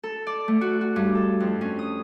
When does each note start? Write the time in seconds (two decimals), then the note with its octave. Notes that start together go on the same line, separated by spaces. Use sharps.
0.03 A4
0.27 D5
0.48 A3
0.61 F#4
0.81 F#4
0.96 G2
1.15 A4
1.40 F2
1.61 C#4
1.79 D#6